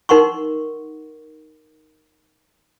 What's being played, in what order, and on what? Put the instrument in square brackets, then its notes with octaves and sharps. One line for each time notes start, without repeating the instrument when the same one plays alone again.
[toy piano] D#4 A#4 F#5 C6 C#6